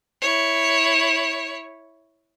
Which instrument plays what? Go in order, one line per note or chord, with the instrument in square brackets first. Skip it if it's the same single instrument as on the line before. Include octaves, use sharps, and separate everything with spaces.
[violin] E4 C#5